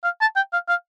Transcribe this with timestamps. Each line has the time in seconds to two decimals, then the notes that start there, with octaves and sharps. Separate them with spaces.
0.04 F5
0.21 A5
0.36 G5
0.53 F5
0.68 F5